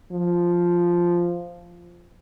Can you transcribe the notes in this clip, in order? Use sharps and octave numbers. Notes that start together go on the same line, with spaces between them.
F3